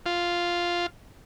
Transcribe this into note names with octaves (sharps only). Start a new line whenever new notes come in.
F4